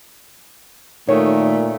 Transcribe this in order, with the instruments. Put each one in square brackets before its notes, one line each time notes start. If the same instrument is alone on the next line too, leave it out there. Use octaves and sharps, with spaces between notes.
[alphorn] A#2 [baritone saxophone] D#3 [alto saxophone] A3 [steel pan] C#5